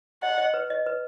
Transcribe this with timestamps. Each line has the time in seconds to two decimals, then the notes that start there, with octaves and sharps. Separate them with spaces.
0.23 D#5 F#5
0.38 D#5
0.54 B4
0.70 D#5
0.86 B4